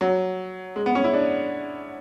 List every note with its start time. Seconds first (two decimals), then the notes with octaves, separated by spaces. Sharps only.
0.01 F#3
0.76 G#3
0.86 B3
0.95 C#4
1.04 E4
1.13 D4